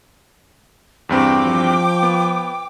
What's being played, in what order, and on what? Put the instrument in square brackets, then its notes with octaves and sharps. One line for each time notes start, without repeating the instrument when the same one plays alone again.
[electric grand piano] E2 G2 C4 [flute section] G5 D6
[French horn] F3
[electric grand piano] B3